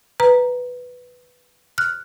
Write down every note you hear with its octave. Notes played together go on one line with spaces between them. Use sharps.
B4 A#5
F6 F#6